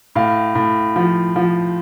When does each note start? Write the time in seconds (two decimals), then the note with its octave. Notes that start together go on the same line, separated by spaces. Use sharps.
0.15 A2 F5
0.55 A2
0.96 F3
1.36 F3